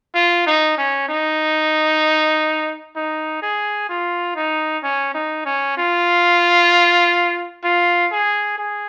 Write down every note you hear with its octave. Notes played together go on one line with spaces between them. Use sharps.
F4
D#4
C#4
D#4
D#4
G#4
F4
D#4
C#4
D#4
C#4
F4
F4
G#4
G#4